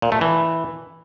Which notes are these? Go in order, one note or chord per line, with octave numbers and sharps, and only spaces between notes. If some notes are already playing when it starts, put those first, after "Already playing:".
A#2
A3
E3